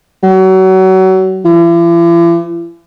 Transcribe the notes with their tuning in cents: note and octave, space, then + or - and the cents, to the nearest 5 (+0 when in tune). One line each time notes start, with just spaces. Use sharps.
F#3 +30
E3 +45